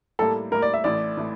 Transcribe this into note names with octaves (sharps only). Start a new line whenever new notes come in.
A2 G3 A#3 A4
A2 G3 A#3 A#4
D5
E5
A1 A2 E3 A3 D5
A2 E3 A3